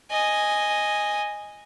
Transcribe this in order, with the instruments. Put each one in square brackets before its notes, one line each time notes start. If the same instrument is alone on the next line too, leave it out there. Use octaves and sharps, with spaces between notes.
[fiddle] D#5 G#5